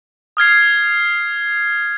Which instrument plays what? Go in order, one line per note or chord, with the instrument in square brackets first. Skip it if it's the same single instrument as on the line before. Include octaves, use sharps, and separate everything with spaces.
[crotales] D#6 F6 G#6 C7